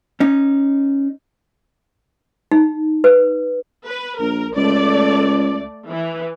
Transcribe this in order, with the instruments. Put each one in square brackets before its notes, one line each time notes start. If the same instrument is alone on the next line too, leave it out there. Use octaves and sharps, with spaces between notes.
[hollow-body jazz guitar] C#4 D#4
[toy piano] D#4
B4
[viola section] B4
[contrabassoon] A#1 [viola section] A#4
[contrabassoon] C#2 [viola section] A3 D5
[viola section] E3